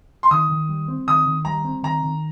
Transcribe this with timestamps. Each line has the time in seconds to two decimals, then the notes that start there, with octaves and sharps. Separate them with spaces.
0.23 C6
0.31 D#3 D#6
0.50 D#3
0.69 G3
0.88 C4
1.08 D#3 D#6
1.26 D#3
1.45 G3 A#5
1.64 C4
1.83 D#3 A#5
2.03 D#3